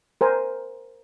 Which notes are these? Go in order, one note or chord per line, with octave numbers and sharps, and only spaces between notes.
A#4 C5 G#5